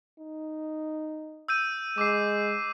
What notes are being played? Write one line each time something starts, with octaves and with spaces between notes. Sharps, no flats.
D#4
E6 G6 D#7
G#3 D6 E6 C7